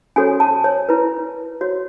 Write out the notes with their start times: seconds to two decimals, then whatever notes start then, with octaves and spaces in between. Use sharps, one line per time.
0.16 C#4 F#4 A4 C#5 G#5
0.40 A5
0.64 C#5
0.89 E4 B4
1.61 F#4 C#5